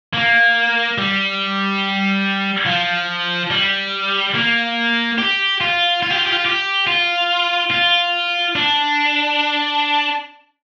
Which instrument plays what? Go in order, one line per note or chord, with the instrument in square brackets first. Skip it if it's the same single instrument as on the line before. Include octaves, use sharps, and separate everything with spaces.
[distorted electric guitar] A#3
G3
F3
G3
A#3
G4
F4
F4
G4
F4
G4
F4
G4
F4
F4
D4